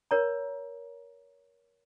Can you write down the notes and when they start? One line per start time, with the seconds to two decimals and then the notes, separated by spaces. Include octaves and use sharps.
0.11 A#4 C#5 A#5